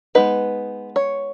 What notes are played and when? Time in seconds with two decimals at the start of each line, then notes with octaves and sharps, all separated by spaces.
0.15 G#3 B3 D#4 B4
0.96 C#5